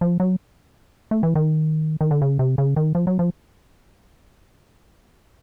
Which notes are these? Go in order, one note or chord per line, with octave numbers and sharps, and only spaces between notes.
F3
F#3
A3
E3
D#3
D#3
D3
C#3
C3
C#3
D#3
F3
F#3
F3